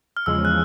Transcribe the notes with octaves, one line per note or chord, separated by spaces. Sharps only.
F6
E2 C#3 F3 G#3 E6
F#6